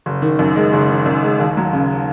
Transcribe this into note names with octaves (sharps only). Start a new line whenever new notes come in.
F#1
D#3
F#2
G#3
F#1
D#3
F#2
G#3
D#2
F#3
C#3